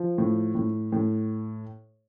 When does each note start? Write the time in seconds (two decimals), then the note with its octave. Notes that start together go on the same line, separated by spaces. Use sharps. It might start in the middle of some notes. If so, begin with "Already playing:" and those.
Already playing: F3
0.18 A2
0.55 A2
0.92 A2